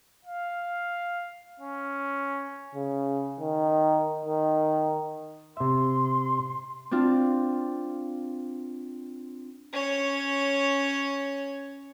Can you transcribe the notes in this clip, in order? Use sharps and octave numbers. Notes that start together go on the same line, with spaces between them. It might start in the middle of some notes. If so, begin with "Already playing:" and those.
F5
C#4
C#3
D#3
D#3
C3 E5 C6
C4 D4 F4
C#4 C#5